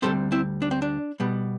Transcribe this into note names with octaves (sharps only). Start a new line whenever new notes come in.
D2 D3 G3 C4 A4 C5
C4 E4
D4
C4
D4
B2 G3 B3